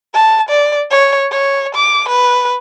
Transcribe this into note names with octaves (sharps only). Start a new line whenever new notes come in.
A5
D5
C#5
C#5
D6
B4